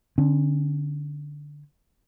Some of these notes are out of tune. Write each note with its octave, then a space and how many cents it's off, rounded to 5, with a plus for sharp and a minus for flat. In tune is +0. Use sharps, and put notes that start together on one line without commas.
D3 +0 C#4 -40